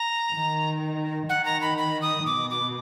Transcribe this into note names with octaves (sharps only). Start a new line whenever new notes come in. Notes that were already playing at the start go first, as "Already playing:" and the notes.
Already playing: A#5
D#3
D#3 F#5
A#5
B5
B5
D#6
B2 D6
D6